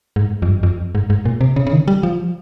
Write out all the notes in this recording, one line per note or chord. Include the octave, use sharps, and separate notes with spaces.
G#2
F2
G2
F2
G#2
G#2
A#2
C3
C#3
C#3
D#3
G3
F3